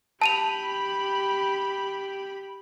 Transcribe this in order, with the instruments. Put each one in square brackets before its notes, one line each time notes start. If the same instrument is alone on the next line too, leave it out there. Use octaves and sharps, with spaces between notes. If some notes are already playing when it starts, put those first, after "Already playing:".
[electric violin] G4 B5 [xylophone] A5 D#7 F7